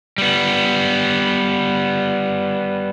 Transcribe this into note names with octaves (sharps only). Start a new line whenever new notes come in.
G3 B3